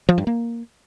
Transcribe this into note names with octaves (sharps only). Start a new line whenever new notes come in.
F3
G2
A#3